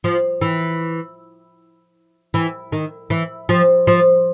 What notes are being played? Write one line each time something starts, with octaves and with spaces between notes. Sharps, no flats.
F3
E3
E3
D#3
E3
F3
F3